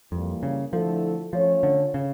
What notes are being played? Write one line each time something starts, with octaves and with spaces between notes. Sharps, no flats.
F2 E3 G3 A#3
C#3
D3 F3 A3 E4 A4
F3 A3 C#4 F4 C#5
D3
C#3